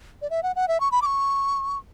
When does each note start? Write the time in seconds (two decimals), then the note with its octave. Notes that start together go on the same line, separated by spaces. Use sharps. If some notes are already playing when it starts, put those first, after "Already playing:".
0.22 D5
0.30 E5
0.43 F#5
0.56 F#5
0.68 E5
0.80 C#6
0.92 B5
1.02 D6
1.06 C#6